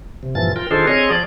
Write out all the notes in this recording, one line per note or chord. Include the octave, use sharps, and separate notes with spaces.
C3
G2 A#2 E3 F3 A6
F4 A#4 G5
D#3 D4 F4 G#4 A4 C5
C4 G#4 C#5 D#5
F3 D5